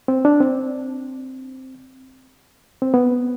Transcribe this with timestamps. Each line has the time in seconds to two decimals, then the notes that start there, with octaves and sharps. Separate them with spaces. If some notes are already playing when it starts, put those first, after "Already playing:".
0.08 C4
0.25 D4
0.40 C4
2.82 C4
2.94 B3